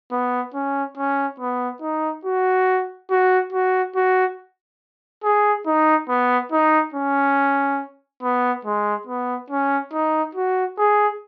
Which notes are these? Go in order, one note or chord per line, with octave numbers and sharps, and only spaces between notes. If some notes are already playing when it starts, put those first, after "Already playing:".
B3
C#4
C#4
B3
D#4
F#4
F#4
F#4
F#4
G#4
D#4
B3
D#4
C#4
B3
G#3
B3
C#4
D#4
F#4
G#4